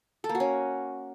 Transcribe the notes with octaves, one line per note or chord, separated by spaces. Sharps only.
A4
A#3
F#4
C#4